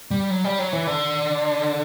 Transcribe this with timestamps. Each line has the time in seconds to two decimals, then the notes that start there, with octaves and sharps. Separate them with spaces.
0.11 G3
0.30 F#3
0.44 G3
0.59 F#3
0.73 E3
0.87 D3